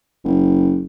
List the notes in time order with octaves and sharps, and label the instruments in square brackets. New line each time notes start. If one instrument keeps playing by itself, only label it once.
[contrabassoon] F#1